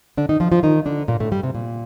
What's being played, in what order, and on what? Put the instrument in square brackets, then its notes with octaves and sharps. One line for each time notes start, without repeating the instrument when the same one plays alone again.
[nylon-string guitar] D3 D4
D#3 D#4
F3 F4
F3 F4
D#3 D#4
D3 D4
A#2 A#3
A2 A3
G2 G3
C3
A#2